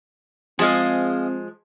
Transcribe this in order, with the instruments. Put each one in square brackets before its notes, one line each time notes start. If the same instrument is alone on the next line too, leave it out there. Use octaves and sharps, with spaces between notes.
[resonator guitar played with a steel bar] F3 G#3 [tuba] C4 [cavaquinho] G#4 D#5 F5